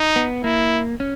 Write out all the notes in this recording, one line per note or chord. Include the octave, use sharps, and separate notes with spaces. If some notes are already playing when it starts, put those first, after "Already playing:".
Already playing: D#4
B3
A#3 E4
C#4